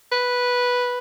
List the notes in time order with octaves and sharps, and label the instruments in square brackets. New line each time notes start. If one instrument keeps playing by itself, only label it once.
[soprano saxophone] B4